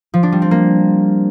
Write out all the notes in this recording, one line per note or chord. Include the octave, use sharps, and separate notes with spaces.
F3
D4
G3
C4
A#3